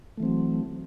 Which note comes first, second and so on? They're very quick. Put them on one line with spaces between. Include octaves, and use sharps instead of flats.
A3 E3 C4 F#3